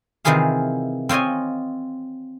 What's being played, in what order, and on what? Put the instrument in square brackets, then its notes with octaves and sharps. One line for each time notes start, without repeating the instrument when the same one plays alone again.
[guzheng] C3 D#3 E3 F4 G#4 F5
C4 F4 C#5 D#5 G#5